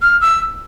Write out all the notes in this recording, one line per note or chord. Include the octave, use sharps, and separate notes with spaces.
F6
E6